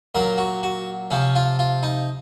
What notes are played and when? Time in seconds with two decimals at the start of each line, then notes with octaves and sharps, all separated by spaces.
0.15 A#2 F#3 A#4
0.38 F#4
0.63 F#4
1.11 C3 F3 C#4
1.35 F4
1.59 F4
1.83 D#4